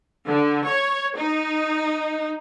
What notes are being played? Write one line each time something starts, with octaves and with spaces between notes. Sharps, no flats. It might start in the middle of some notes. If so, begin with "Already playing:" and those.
D3
C#5
D#4